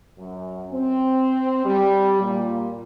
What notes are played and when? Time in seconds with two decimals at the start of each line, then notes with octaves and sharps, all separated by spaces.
0.18 F#2
0.71 C4
1.65 G3
2.21 A#2